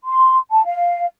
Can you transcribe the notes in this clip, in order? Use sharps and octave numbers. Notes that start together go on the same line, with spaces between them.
C6
A5
F5